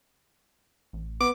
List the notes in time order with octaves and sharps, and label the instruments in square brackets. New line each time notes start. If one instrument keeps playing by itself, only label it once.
[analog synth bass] A1
[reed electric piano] B3 [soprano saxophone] D6